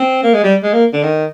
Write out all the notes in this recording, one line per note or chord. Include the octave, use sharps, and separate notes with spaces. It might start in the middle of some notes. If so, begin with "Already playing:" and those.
Already playing: C4
A#3
G#3
G3
G#3
A#3
D3
D#3